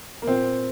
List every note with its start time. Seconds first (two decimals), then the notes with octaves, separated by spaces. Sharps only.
0.22 A#3
0.27 A#2 C4